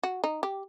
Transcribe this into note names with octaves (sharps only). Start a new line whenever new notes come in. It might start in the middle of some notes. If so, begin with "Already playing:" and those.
F#4
D#4
G4